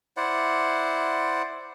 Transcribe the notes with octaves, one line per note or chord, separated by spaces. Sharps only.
E4 C5 D5 F#5